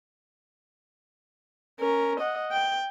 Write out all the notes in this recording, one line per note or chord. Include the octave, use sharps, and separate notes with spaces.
C#4 A#4
D#5 F#5
G5